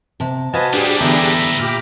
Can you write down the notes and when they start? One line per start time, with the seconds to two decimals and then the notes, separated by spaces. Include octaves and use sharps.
0.20 C3 A5
0.54 F#4 B4 C5 D#5 F5 G#5 A5
0.73 A2 G3 D4 G4 G#4 D5
1.00 E2 D3 E5 A#5 B5
1.59 A#2 G4 D6 F6